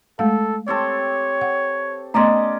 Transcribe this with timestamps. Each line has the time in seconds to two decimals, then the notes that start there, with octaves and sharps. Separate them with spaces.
0.19 G#3 A3 A4 F5
0.68 C4 G4 A4 C#5
1.41 F#5
2.14 A3 B3 C#4 D5 D#5 A#5 C6